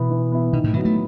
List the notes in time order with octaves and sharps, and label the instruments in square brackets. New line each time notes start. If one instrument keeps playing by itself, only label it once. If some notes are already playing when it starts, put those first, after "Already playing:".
Already playing: [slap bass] B2 [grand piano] E3 B3 E4
[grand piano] E3
B3 E4
[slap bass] B2 [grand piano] D#3
[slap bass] A2
[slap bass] D#3 [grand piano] F#3 B3 E4
[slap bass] A3